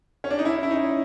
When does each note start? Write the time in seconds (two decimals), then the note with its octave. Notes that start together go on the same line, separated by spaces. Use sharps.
0.24 C#4
0.31 D4
0.39 D#4
0.45 C#4 E4
0.63 E4
0.71 D#4